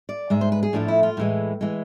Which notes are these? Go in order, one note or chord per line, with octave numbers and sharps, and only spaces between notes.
D5
G#2 G#3 E5
C5
B4
G#4
A2 F3 A3 D4
E4
F4
A2 E3 G#3
E3 G#3